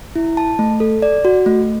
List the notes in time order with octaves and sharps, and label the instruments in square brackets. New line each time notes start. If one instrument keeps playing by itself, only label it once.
[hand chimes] E4
A5
A3
A4
D5
F#4
A3